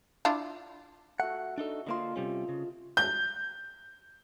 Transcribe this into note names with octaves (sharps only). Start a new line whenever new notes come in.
D4 E4 F4
A3 F#4 F#5
D4 D#4 A4
D3 A#3 F4 C5 D#5 C6
C3 G3 C#4
C#3
G6